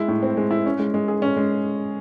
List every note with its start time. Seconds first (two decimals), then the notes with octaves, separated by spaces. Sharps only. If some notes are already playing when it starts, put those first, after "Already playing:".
Already playing: G#3 E4
0.08 A2
0.23 C4
0.37 G#3
0.51 E4
0.66 C#4
0.79 G#3
0.94 G#3
1.08 G#4
1.22 C#4
1.37 G#3